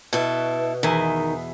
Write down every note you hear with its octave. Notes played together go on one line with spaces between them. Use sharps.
B2 E4 A4
E2 D#3 E5 G#5